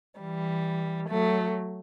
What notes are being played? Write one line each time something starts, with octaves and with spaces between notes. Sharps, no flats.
E3 G3
F#3 A3